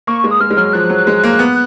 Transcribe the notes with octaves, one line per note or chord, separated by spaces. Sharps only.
A#3 C#6
G#3
D#6
G#3 F6
G#3
F#3 F6
F3 F#6
F#3
G#3
A#3
B3